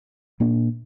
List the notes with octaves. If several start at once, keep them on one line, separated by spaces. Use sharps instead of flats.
A#2 A#3 D4